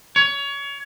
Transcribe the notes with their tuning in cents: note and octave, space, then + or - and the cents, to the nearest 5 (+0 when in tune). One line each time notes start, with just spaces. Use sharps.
C#5 +25